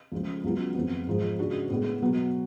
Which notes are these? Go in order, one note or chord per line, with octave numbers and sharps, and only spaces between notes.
C#2 C#3 F3 A3
C#2 C#3 F#3 B3 F4
F2 F3 B3
G#2 F3 G#3
C#3 G#3 D4 F#4
A2 G#3 B3
B2 F#3 B3 F#4